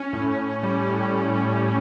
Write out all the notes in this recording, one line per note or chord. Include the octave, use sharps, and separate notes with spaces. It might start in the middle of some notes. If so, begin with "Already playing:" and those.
Already playing: C#4
A2
A2
G3
A2